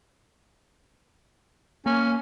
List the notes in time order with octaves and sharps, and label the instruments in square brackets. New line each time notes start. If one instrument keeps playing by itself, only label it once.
[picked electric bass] A#3 [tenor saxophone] C#4